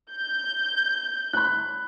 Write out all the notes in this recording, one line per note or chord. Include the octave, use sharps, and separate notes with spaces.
G6
B5 F#6